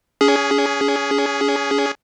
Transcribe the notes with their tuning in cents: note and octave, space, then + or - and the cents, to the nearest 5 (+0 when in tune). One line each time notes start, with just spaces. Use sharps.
C#4 +30 G#4 +0